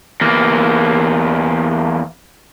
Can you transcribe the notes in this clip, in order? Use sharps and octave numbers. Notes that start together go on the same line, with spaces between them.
E2 A#3